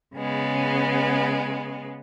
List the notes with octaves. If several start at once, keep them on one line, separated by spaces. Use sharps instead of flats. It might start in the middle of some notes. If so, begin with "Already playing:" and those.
C#3 G#3 B3